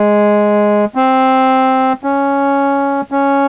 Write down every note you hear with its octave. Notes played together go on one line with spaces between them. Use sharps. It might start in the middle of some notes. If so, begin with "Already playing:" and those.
Already playing: G#3
C4
C#4
C#4